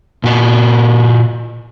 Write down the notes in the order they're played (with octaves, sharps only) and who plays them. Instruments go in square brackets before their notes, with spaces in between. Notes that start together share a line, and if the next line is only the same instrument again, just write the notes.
[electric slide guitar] A#2 F#4